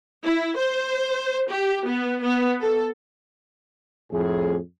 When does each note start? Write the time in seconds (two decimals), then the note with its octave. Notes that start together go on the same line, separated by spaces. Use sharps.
0.24 E4
0.56 C5
1.49 G4
1.86 B3
2.21 B3
2.61 A4
4.11 F2 A2 G#4